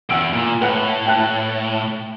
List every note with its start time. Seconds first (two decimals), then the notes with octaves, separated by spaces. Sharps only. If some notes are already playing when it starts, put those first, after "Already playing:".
0.10 E2 F#5 E6 D7
0.33 A#2
0.62 A2 B4 F#5 F#6
1.06 G5 A5 F#6